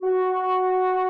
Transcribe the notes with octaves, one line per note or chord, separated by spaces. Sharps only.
F#4